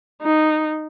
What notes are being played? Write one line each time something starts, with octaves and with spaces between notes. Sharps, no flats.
D#4